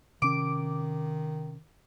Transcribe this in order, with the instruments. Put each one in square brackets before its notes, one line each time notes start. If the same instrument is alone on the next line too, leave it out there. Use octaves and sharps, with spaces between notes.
[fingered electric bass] C3 C#4 [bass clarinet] D#3 [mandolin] D6